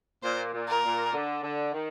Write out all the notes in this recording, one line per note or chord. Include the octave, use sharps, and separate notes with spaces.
A#2 C5
A#2
A#4
A#2
D3
D3
D#3